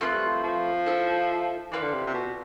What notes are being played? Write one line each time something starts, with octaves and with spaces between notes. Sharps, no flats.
F3 A3 C4 F4 B4
G3
F3
F3
E4 A4 C5 E5
E3 F4 B4 D5
D3
C3
C3
B2